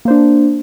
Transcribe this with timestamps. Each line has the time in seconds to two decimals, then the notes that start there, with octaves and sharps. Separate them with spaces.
0.05 A#3
0.08 C5
0.10 D4